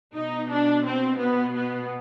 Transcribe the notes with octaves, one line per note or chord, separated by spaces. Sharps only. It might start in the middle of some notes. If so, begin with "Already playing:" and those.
B2 D#4
D4
C4
B3
B3